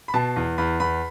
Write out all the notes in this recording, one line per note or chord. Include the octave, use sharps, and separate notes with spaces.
B5
B2 A5
E2
E2 B5
E2 B5